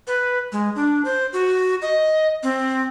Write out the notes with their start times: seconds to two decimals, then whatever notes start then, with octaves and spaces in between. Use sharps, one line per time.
0.07 B4
0.52 G#3
0.76 D4
1.05 C5
1.33 F#4
1.82 D#5
2.43 C4